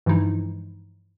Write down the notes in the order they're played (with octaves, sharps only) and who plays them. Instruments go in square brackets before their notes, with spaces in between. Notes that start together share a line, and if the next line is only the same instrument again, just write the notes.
[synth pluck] G2 E3 F3 G#3 D#4 E4